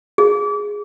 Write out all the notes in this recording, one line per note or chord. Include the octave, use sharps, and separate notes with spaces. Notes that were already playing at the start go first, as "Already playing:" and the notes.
G#4